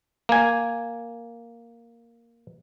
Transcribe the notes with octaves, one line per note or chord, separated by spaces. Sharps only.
A#3 G#5